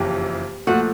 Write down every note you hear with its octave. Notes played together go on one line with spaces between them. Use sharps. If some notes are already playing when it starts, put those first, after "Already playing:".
Already playing: F#1 F2 C#3 E3 G4
A#2 F3 A3 F#4